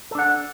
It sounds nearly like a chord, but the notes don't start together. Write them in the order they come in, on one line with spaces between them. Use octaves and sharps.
A4 D4 F#5